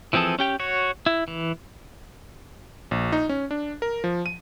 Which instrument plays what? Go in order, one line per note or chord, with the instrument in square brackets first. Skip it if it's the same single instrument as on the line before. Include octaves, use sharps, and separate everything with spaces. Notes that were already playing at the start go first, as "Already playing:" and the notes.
[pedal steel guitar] E3 F3 C4 G#4 A4
C#4 G4 G5
F#4 C#5
E4
E3
[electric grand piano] A#1
D#4
C#4
D4
A#4
F3
D#7